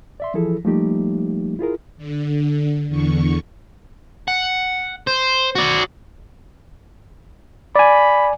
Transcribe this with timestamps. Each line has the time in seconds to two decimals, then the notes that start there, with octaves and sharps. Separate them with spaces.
0.20 D5 E5 C6
0.34 E3 F3 E4 G#4 A4
0.64 F3 G3 A3 A#3 D#4 G4
1.59 E4 F4 G#4 A#4
1.97 D3
2.88 E2 D3 C#6
4.28 F#5
5.07 C5
5.55 F#4 D5
7.76 D5 G#5 B5